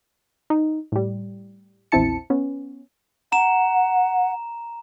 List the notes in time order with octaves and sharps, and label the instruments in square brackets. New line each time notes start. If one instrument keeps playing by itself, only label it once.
[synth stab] D#4
A2 G3
A#1 E2 C4 E4 A5 C#7
B3 C#4
[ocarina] F#5 [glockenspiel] A#5 E7